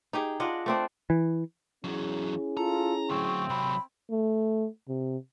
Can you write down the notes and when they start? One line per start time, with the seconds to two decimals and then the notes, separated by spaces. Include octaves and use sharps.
0.13 D#4 G4 G#4
0.40 D4 F4 D#5 F#5
0.66 A3 C4 D4
1.10 E3
1.84 E2 F#3 C#4 E4 G#4
2.57 F4 A4 A#5
3.10 D2 F#3 C4 C#6
3.50 C3 F#3 B5
4.10 A3
4.88 C3